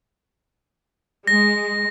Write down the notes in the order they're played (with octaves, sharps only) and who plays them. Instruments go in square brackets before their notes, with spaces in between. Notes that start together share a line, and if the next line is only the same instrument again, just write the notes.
[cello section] G#3 [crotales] A#6